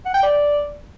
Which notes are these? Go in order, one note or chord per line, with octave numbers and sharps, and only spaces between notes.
F#5
G5
D5